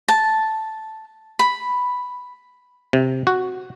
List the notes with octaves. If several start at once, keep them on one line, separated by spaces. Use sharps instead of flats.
A5
B5
C3
F#4